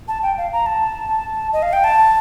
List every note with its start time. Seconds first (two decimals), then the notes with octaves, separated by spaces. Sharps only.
0.08 A5
0.23 G5
0.38 F5
0.53 A#5
0.66 A5
1.53 D#5
1.63 F5
1.73 G5
1.84 A5